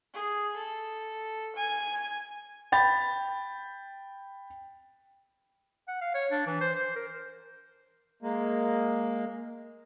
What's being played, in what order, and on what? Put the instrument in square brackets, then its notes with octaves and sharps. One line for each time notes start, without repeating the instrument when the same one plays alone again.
[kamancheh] G#4
A4
G#5
[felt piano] G5 B5 A6
[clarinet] F#5
F5
C#5
D4
E3
C5
C5
A#4
[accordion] G#3 A#3